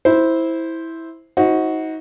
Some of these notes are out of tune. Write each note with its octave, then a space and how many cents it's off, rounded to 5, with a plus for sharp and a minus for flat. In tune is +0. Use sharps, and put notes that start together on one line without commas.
E4 -10 C5 +0
D#4 +35 F#4 +0 C5 +20